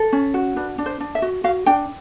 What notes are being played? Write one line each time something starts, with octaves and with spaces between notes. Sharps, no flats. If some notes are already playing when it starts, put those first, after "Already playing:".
Already playing: A4
C#4
F#4
D4 B4
D4
C5
D4
E5
F#4
F#4 F5
D4 G5